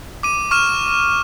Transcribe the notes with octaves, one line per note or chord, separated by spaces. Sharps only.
D6 D#7
C#6 F6 D#7 E7